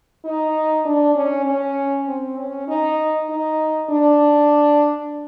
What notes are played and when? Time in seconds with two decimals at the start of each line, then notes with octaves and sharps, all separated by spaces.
0.25 D#4
0.86 D4
1.16 C#4
1.46 C#4
2.08 C4
2.38 C#4
2.68 D#4
3.29 D#4
3.90 D4